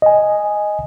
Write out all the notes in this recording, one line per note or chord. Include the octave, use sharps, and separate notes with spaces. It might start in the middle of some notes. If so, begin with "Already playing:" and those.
D#5 G#5